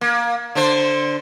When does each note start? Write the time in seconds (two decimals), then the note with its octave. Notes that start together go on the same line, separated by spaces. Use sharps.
0.01 A#3
0.55 D3 D4 C5